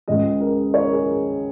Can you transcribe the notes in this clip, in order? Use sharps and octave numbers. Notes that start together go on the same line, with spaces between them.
C#2 C#3 G#3 D#5
A#4
C#5
A#4
G#4
A#4